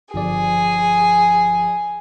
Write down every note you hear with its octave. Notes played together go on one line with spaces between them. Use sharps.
G1 F3 G#4 D5